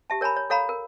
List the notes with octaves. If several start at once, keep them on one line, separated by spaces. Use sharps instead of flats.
G4 E5 A5
A#4 C#5 G#5 A#5 B5
C#5
A4 C#5 F5 A#5 B5
A#4